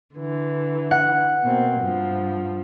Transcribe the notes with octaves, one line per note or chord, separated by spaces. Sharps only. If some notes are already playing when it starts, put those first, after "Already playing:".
D3 E3
F#5
B2 A#3 C4
G2 F3